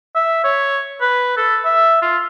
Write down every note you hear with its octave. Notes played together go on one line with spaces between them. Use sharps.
E5
C#5
B4
A4
E5
F4